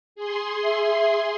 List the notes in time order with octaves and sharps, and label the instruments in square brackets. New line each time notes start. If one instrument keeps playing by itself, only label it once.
[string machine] G#4 C6
[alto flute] E5